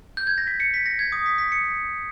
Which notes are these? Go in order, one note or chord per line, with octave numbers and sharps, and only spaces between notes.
G6
G#6
A#6
B6
C#7
B6
A#6
G#6
D#6
B6
B6
C#7